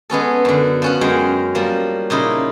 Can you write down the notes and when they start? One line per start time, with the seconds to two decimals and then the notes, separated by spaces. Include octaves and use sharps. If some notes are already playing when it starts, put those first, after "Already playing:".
0.10 G#3 B3 C#4 A4
0.45 F#2 D3
0.82 F3 C#4 F#5
1.01 F#2 G#3 G5 A#5
1.55 F3 G3 A#3
2.10 A#2 C#3 D#4 E4